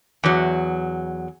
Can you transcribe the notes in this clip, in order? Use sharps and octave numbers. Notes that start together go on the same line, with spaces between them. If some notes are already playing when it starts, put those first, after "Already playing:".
E2 F#3